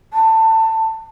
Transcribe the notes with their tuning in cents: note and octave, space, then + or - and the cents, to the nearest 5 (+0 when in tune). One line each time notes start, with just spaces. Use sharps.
A5 +20